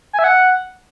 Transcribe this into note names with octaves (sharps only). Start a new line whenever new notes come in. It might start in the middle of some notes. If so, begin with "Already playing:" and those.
G#5
E5
F#5